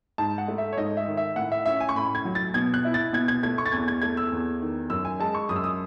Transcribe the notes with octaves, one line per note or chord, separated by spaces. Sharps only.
G#2 A5
F#5
A3
E5
C#5
G#2 D#5
E5
D#3
E5
A2 F#5
E5
C#4 E5
G#5
C#6
A2 B5
G#6
F#3
A6
B2 G#6
F#6
E4
A6
B2 G#6
G#6
A3 G#6
C#6
A6
E2 G#6
G#6
A3 G#6
E6
E2
D#3
F#2 E6
G#5
G#3 A5
C#6
F#2 D#6
E6
D#6